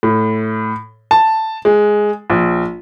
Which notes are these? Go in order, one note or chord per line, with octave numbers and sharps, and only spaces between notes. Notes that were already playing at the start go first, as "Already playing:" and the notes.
A2
A5
G#3
A#1